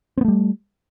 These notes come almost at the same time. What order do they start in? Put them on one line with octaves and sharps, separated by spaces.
C4 B3 A3 G3